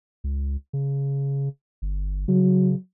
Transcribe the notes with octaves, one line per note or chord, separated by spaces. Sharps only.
C#2
C#3
G1
C#3 F#3